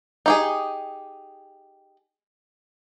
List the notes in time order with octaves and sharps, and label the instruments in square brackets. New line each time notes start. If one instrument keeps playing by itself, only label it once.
[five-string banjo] D#4 G4 G#4